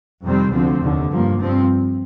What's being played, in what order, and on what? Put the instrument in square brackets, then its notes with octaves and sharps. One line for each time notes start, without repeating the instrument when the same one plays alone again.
[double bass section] F2 C3 D#3 G3 C4
D2 D3 F3 C4
F1 D#2 D3
G2 F3 A#3
G2 F3 C4